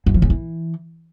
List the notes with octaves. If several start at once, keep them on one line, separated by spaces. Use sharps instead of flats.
F#2
F3
C#3
E3